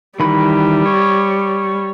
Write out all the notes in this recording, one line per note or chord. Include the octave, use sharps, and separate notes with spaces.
D#3 E3 G3 B5
C#5